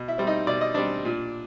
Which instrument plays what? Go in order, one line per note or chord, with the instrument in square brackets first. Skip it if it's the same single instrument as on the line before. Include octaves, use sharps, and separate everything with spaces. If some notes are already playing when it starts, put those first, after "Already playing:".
Already playing: [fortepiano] B2
E4 E5
G3 C4
D#4 D#5
B2 D5
D#5
G3 C4 D4 D5
A#2